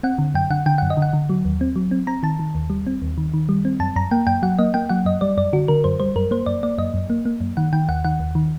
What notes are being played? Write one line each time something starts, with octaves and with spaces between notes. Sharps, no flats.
C4 F#5
D3
F#2 G5
D3 F#5
D3 G5
F#2 F#5
D#5
D3
F#5
D3
F#3
D#2
C4
F#3
C4
C4 A#5
D#3 A5
D#3
D#2
G3
C4
D#2
D#3
D#3
G3
C4
F#2 A5
F#2 A#5
A#3 G5
F#2 G5
F#3 F#5
A#3 D#5
A#3 G5
F#3 F#5
F#2 D#5
G3 D5
F#2 D5
D3 F#4
D3 A#4
F#2 C5
G3 C5
F#2 A#4
A#3 C5
F#2 D5
A#3 D5
F#2 D#5
F#2
A#3
A#3
F#2
D#3 F#5
D#3 G5
D#2 F#5
D#3 F#5
D#2
D#3